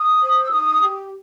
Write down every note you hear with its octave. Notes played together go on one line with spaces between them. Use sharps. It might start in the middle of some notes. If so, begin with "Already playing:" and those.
Already playing: D#6
C5
E6
D#4 D#6
G4